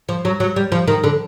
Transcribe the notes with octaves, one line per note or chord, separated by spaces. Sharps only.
F3
F#3
F#3
G3
F3
D#3
D3